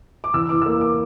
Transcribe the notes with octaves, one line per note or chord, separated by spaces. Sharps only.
D6
E2 E6
E3 D6
E6
A#3 D6
D6